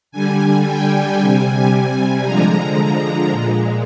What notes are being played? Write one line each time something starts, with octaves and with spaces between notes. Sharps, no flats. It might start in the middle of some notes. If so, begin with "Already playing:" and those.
D3 G3 G#5
G5
C3 G3 G#5
D3 F3 G#3 A#5
A#5
A#2 G#3